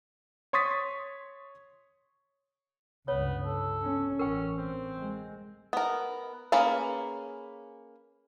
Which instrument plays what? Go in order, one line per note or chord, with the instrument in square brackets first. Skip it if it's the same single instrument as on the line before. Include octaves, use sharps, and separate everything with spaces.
[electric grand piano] C#5 C6 C#6 D#6 A6 B6
[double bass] C#2 G2 [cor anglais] B3 [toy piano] C#5
[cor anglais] A4
[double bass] C#4
[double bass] A1 [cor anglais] C#4 [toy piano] A#4 G5
[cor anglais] C4
[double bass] G#3
[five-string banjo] B3 A#4
A#3 C#4 G#4 B4 F5